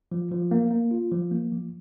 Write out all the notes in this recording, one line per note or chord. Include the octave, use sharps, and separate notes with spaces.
F3
F3
A#3
A#3
F4
F3
A#3
F3